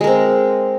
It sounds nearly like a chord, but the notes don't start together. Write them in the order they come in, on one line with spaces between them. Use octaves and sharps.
G#3 A#4 C4